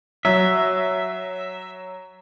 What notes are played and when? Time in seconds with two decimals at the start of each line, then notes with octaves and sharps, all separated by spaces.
0.25 F#3 E5